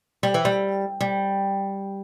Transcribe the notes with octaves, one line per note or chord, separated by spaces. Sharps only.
G3
E3
G3
G3